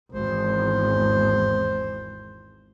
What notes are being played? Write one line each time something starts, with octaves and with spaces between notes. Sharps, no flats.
G#1 E2 C5